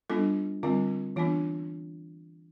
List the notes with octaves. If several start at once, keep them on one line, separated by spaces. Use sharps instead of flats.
G3 B3 D4 F4 A4
D3 G3 C4 F4
E3 B3 D4 F4